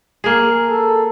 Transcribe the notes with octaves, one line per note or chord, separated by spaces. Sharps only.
A#3 G#4
A4